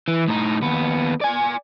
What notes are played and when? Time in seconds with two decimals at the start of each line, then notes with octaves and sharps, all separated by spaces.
0.08 E3
0.28 A2 D#4
0.62 D#2 B3
1.22 D5 G#5